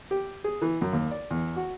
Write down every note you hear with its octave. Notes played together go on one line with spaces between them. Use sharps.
G4
G#4
E3
F#2
D#2
D5
E2
F#4